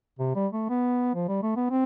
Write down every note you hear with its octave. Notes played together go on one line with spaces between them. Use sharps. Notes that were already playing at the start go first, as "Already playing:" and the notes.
C3
G3
A3
B3
F3
G3
A3
B3
C4